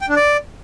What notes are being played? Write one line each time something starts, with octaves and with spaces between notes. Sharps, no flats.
G5
D4
D5